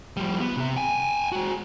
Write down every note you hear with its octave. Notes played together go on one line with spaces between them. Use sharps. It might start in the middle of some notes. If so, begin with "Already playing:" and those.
F3 G3
B3
C3 E5
G5 G#5
G#3 F#4